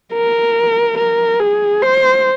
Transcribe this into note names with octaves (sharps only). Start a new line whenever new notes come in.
A#4
A#4
G#4
C5